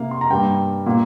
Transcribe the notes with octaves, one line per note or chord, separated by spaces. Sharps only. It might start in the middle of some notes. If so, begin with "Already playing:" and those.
Already playing: C3 A#3 F5
C6
A#5
G2 G3 A#3 G5
A#2 A#3